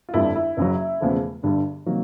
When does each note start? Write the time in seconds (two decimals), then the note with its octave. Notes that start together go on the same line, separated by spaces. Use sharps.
0.09 F4
0.14 G1 F2 D3 G3 E4
0.36 E4
0.57 F#1 F#2 C#3 F#3
1.00 E1 E2 C#3 F3 A3
1.43 G1 G2 D3 G3
1.86 C3 D#3 F#3 A#3